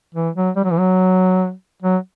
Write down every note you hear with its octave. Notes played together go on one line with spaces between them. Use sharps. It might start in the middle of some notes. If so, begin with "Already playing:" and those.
E3
F#3
G3
F#3
E3
F#3
F#3